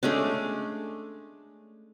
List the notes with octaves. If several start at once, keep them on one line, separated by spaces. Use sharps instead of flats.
G#3 A3 C#4 D4